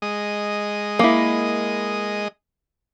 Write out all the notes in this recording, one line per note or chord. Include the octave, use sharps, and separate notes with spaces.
G#3 D#5
A#3 E4